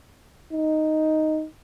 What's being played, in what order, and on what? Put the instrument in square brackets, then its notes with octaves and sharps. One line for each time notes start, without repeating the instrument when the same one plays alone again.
[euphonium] D#4